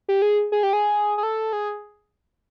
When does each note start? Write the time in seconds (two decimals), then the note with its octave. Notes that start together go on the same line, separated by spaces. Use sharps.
0.08 G4
0.22 G#4
0.52 G#4
0.63 G4
0.73 G#4
1.18 G#4
1.23 A4
1.53 G#4